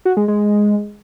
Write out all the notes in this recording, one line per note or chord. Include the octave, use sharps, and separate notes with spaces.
F#4
G#3
G#3